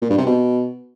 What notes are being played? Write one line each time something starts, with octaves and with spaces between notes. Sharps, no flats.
A#2
G2
C3
B2